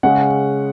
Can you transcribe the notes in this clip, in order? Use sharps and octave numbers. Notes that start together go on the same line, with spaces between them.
C#3 G#3 C#4 F#5